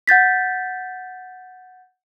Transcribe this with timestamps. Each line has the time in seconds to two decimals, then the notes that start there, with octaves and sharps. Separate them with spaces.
0.07 F#5 G6 A6 B6